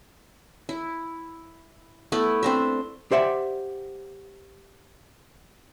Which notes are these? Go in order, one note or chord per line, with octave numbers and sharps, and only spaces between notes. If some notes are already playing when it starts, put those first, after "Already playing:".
E4
A3 B3 E4
C4 D4 E5
G4 C5 D5 E5 F#5